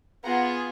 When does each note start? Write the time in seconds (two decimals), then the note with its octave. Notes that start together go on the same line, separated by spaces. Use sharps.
0.24 B3 F4 G#4 F#5 A#5